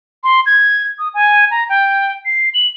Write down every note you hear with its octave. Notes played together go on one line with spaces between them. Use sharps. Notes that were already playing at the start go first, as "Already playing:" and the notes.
C6
G#6
D#6
G#5
A#5
G5
C7
F#7